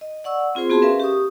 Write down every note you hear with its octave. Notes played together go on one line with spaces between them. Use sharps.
D#5
D5 F#5 C#6 E6
C4 F4 G#4 C5 C6
B3 F#4 G#4 A5 C6
C#4 A#4 B4 E5 F5
G4 C#6 D#6